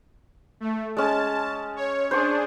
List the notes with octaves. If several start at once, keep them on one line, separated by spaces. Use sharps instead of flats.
A3
G#3 C#4 A5
C#5
D4 G#4 C5 C#6